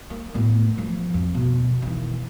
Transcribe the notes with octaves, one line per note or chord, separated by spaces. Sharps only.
A#3
A2 B3
E3 F3
F2
D2 B2
D#3 E3